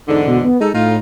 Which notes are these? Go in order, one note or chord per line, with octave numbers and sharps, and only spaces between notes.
E2 G#2 D3 D#4
B2
B3
G#3 D#4 A4
A2 D#4 F4